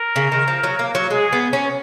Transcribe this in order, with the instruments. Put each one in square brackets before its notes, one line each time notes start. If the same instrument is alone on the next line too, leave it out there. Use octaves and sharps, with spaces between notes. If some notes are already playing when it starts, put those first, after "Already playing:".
Already playing: [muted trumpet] A#4
[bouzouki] C#3
D#3
F3
F#3
A#3
F#3
[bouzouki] G#3 [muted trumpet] G#4
[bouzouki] B3
C#4